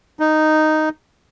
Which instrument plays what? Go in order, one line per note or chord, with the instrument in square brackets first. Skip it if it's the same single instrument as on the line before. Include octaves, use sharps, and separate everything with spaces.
[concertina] D#4